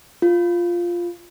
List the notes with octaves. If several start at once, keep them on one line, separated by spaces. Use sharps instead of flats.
F4